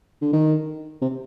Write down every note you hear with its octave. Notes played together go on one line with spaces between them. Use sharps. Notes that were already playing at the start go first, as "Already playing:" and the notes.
D3
D#3
C3